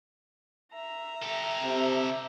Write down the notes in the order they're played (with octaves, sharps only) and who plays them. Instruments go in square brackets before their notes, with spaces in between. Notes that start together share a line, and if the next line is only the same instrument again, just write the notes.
[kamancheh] E5 A#5
[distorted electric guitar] G4 A4
[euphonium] C3